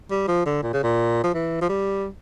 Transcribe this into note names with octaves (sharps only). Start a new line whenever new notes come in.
G3
F3
D3
A#2
C#3
A#2
F3
E3
F3
G3